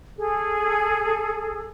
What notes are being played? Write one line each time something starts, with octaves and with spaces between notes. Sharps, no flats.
G#4 A4